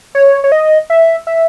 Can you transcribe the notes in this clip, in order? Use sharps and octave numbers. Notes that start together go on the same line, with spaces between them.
C#5
C#5
D#5
E5
E5